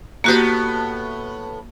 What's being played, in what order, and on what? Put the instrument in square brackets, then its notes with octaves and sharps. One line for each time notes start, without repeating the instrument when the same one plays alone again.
[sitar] A2 B3 [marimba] A#3 F#4 G4